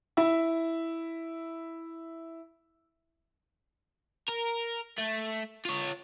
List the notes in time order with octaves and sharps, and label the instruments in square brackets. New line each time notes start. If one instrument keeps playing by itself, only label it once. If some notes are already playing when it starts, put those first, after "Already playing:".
[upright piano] E4 E5
[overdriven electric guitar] A#4
A3
F4 C#5